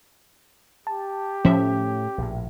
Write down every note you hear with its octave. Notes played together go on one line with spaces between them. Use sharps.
G4 A5
A2 F3 A3 C#4 E5
A#1 A2